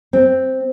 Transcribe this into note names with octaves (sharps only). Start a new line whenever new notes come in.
C4